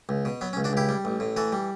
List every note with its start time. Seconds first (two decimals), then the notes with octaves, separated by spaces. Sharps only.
0.09 C#2
0.25 B2
0.41 F#3 B3
0.53 C#4
0.57 C#2
0.64 D4 F#4
0.73 C#2 E4 G4
0.89 G3
1.05 A1
1.20 A2
1.36 E3 F#4 A4
1.52 G3